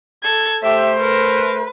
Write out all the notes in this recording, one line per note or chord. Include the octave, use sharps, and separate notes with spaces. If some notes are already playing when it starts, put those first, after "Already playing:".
A4 G#6
A3 G4 C5 E5
A#4 B4